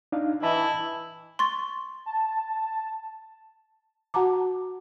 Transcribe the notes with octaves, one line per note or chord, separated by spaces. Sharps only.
D4 D#4 F5
E3 E4 D#5 A5 B5
C6 C#6 A6
A5
F#4 F#5 A5 A#5 D6